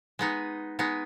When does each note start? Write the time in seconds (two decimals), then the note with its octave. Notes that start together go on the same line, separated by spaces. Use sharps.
0.19 G#3 B3 D#4
0.79 G#3 B3 D#4